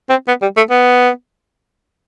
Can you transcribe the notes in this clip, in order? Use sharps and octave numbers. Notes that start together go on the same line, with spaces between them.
C4
B3
G3
A3
B3